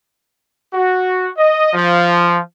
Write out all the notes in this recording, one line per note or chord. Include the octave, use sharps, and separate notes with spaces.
F#4
D#5
F3